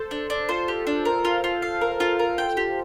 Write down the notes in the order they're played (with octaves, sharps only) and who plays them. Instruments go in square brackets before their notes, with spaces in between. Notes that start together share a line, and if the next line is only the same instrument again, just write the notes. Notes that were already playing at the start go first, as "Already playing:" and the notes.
Already playing: [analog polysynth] A4 C5
[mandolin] D4
D4
[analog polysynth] F4 A4 [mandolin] C5
[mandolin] G4
D4
A#4
F4
F4
F5
A#4
F4
A#4
G5
G4